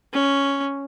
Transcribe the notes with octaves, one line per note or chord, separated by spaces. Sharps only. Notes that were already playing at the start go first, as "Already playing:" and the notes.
C#4